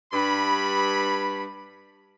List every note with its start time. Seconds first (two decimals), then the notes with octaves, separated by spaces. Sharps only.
0.12 G2 B5